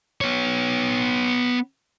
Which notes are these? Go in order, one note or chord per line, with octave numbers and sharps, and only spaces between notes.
B3 C#5